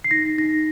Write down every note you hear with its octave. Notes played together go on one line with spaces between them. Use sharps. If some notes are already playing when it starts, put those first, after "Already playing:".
C7
D#4 A#6
D#4 A#6